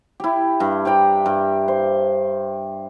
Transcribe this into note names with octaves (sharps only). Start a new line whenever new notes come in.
E4 G4
G2
G4 D5 G5 A#5
G2
C5